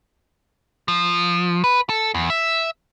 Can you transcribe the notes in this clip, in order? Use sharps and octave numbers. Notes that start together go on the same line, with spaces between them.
F3
B4
A4
E2
E5